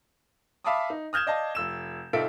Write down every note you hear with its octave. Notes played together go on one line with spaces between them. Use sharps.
E5 F5 A5 B5 D6 D#6
D#4
D#6 F6 G6 G#6 E7
D5 D#5 F5 A5
F1 E6 E7
C2 D#4 F4 A4 E5 D7